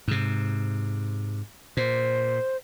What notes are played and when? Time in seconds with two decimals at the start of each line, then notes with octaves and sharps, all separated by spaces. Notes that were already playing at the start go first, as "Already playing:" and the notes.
0.08 G#2 C3
1.77 A#2 C5